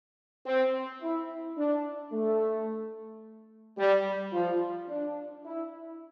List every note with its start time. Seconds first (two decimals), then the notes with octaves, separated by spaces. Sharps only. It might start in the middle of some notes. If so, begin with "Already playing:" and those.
0.46 C4
1.02 E4
1.58 D4
2.13 A3
3.78 G3
4.33 F3
4.89 D4
5.44 E4